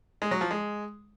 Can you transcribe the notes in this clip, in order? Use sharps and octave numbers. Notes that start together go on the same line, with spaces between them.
G#3
F#3
F3
G#3